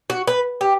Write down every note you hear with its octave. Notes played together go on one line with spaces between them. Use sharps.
F#4
B4
G4